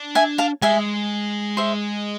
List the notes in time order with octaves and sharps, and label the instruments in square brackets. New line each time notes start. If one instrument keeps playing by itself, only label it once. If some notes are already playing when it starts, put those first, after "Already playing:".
Already playing: [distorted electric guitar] D4
[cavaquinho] E5 G#5
F5 A5
[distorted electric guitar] G#3 [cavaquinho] E5 G#5
[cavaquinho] C5 E5